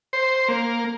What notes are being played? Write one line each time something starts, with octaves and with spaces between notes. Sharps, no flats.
C5
A#3